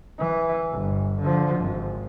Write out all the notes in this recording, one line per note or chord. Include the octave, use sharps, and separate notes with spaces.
E3
G1
D3 F3
G#1